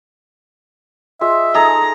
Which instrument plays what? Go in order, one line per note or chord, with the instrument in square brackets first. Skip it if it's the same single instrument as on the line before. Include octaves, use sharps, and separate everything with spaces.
[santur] F4 G#4 D#5 [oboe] E5
[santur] D#4 G#4 A4 [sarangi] A#5